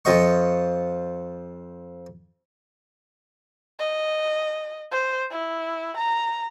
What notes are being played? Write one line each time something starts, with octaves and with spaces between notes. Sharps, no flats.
F2 F3 D#5 C#6
D#5
C5
E4
A#5